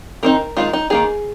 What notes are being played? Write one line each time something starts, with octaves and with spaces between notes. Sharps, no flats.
D#3 C4 D#4 A#4
D#3 G#3 D#4 F4
D#4
D#3 A#3 D#4 G#4